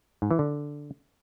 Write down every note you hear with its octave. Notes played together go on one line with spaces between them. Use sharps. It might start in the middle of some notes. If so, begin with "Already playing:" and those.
G#2
E3
D3